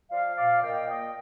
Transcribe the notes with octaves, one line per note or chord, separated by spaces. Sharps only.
F3 D5 F5
A#2 D5 F5
A#2 D#5 G5
A#3 D#5 G5